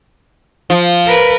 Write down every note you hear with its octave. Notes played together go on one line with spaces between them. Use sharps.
F3
A#4 B4